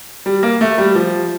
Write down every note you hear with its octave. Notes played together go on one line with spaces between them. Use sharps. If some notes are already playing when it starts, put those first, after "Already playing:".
G3
A#3
A3
G3
F3